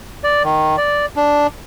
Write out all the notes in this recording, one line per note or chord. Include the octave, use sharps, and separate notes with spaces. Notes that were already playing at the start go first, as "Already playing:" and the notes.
D5
D#3
D5
D4